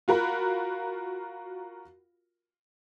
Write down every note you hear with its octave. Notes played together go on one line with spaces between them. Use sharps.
F4 F#4 A#4 B5